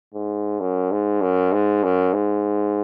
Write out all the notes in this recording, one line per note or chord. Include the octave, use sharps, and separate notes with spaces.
G#2
F#2
G#2
F#2
G#2
F#2
G#2